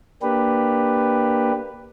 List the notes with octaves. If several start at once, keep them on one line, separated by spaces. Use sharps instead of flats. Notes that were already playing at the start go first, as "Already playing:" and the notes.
A#3 D4 G4 B4